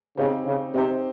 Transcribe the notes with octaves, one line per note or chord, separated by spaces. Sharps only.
C#3 C4 D#4 G4 C5
C#3
C3 C4 D#4 G4 C5